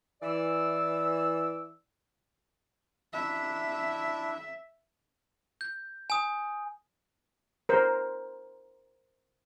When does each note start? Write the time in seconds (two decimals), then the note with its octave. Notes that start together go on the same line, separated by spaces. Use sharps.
0.22 E3 D5 E6
3.14 D4 E4 E5
5.61 G6
6.10 G#5 D#6
7.69 A#4 C5